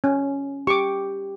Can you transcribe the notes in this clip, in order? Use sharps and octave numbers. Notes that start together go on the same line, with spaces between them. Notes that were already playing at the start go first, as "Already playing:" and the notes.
C#4
G4 C#6 D6